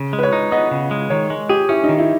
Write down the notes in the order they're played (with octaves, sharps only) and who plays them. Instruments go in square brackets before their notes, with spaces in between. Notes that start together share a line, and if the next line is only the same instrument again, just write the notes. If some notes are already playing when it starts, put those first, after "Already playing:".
Already playing: [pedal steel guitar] C#3
G#3
[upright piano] B4
C#5
[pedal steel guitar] D#4
[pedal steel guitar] B3 [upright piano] D#5
[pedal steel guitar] C#3
G#3
[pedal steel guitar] D#3 [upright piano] C#5
[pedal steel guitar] G#3
[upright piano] G4 [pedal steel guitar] G#4
[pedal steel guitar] C#4 [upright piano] E4
[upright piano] D#4
[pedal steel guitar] D#3
[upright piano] E4